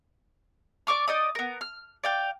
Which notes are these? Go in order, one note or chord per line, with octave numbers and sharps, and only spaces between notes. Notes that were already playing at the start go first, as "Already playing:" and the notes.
D5 C#6 D6 F6
D#4 D5 D#5 D#6
B3 A#4
F6
D5 F5 G5